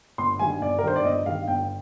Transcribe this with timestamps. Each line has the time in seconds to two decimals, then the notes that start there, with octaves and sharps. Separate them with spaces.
0.18 G1 C6
0.39 G2 D#3 G#5
0.61 G1 D5
0.79 A#4
0.83 G2 D#3 C5
0.96 D5
1.04 G1 D#5
1.26 G2 D#3 F5
1.47 G1 G5